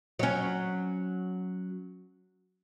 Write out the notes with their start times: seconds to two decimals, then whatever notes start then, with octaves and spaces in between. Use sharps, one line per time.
0.19 F#3 C#4